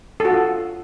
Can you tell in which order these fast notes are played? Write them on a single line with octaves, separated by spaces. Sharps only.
A4 F#4 F4